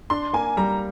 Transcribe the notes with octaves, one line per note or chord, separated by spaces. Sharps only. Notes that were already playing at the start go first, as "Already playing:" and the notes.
D4 C6
A#3 G#5
G3 A#5